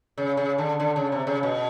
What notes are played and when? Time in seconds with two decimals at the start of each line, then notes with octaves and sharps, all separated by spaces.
0.18 C#3
0.37 C#3
0.58 D3
0.80 D3
0.96 C#3
1.12 C3
1.27 C#3
1.43 B2